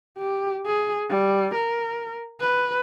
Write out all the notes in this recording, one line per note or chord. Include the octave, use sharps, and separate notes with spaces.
G4
G#4
G3
A#4
B4